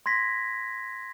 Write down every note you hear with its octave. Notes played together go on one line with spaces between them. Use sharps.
C6 G#6 A#6 B6